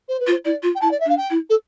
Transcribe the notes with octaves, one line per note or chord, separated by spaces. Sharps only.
C5
B4
F4
C5
E4 D5
F4
G5
E4 A5
D5
E5
D4
F5
G5
E4
A4